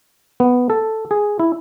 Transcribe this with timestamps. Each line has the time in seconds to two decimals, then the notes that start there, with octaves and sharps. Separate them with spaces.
0.40 B3
0.70 A4
1.11 G#4
1.40 E4